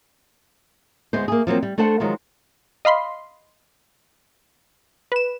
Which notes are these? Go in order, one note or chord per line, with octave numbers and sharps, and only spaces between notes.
D2 G#3 B3 C5
A#3 G#4
F3 F#3 A#3 C4
G3
A3 D4 A4 C5 F#5
D#3 F3 F#3 G#3
D#5 F5 B5 C6
B4 E7